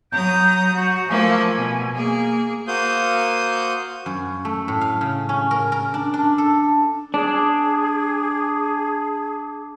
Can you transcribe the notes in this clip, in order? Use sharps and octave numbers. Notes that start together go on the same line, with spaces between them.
F#3 A#5 D#6 G6
F#4
F3 A3 A#3 G#5
B2
A#3 G#4
A#3 F#4 C5 F5 D#6 G6
F#2
A3
A2
F5
C#3
C#4
A#4
A#4
D4
D4
A4
D4 G#4